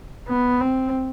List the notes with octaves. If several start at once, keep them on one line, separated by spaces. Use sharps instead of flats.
B3
C4